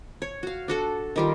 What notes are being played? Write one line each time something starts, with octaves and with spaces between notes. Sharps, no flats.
C#5
F#4 F5
D4 F#4 A4
D#3 G3 F4